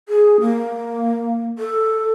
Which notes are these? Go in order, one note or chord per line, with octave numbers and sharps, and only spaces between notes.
G#4
A#3
A4